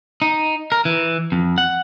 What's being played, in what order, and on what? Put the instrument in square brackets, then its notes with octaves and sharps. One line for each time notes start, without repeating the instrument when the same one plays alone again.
[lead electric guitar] D#4
A#4
E3
F2
F#5